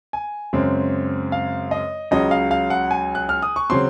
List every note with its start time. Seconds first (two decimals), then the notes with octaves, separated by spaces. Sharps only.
0.13 G#5
0.53 F#2 C#3 G#3 C4
1.32 F5
1.71 D#5
2.11 C#2 C#3 F#3 D#5
2.31 F5
2.51 F5
2.70 F#5
2.91 G#5
3.15 F#6
3.29 F6
3.42 D#6
3.56 C#6
3.70 C#3 F#3 C4 C6